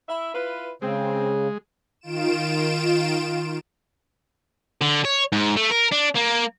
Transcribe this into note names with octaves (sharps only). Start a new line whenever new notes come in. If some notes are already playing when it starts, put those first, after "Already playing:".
E4 E5
E4 F4 B4
C#3 G#3 C4
D#3 F4 D7 E7
D3
C#5
G#2
A3
A#4
D4
A#3